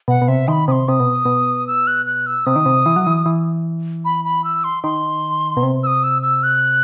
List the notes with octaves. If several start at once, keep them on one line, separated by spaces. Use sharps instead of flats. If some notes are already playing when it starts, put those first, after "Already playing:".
B2 F#5
B2
C3 E5
D#3 B5 C6
C3 C6 D#6
C3 D#6
B2
B2
E6
F#6
F#6
E6
C3 D#6
D#3
C3
E3
F#3
E3
E3
B5
B5
E6
C6
D#3 C6
B2
C3
E6
D#6
E6
E6
F#6